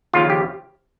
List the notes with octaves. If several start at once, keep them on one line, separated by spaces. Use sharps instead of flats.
D#2 C#3 F3 F4
G4